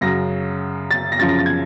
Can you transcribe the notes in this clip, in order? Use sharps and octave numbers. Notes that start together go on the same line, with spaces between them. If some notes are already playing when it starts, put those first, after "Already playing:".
F#2 C#3 F#3 A#6
A6
A#6
F#2 C#3 F3 A6
A#6
A6
G#6